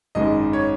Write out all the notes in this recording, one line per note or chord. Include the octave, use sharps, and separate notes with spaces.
G#1 F#2 D#3 G#3 D#5
C#5